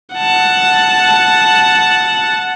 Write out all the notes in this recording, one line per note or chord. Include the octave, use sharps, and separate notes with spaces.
F#5 A5